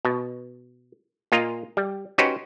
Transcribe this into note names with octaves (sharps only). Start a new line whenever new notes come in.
B2
A#2 A#3 F4 D#5 A#5
G3
C#4 D#4 F#4 G4 B4 C5